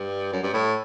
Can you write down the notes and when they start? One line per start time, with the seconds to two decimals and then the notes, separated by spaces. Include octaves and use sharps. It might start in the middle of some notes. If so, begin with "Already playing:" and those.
Already playing: G2
0.32 F#2
0.43 G2
0.53 A2